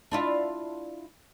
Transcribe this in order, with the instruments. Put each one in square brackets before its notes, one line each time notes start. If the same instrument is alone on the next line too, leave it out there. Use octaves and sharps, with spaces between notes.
[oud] D4 E4 F4